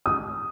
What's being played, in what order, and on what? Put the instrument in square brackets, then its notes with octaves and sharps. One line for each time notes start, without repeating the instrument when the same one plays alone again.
[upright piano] D#6